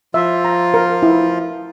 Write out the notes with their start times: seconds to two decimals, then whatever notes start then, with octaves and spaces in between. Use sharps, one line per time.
0.14 F3 F4 E5
0.45 A#5
0.74 A#4
1.03 E4